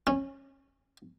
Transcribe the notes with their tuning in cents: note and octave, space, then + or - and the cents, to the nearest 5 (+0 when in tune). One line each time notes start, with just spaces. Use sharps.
C#4 -20